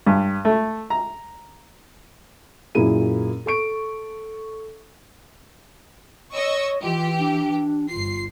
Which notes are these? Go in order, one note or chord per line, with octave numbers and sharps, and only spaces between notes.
G2
A3
A#5
F#2 A#2 A#3 E4 G#4 D#7
A4 C#6 D7
C#5 D#5 C#6 E6
E3 F4 G4
D4
G1 F4 C7